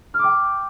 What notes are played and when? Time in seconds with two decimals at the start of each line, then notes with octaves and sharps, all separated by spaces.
0.14 F6
0.19 D6
0.24 G5
0.29 C6